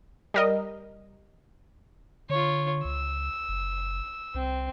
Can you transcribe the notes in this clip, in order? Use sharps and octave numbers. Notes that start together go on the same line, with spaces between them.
G3 A#4 D#5
D3 F4 C#5
C#2 E6
F#1
C2 C4